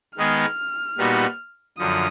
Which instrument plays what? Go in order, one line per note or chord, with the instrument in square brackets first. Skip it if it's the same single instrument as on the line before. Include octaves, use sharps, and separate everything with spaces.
[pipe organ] D#3 G#3 B3 D#4 G#4 [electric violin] F6
[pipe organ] A#2 G3 B3 D#4 F#4
[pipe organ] F#2 D3 F3 [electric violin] D#6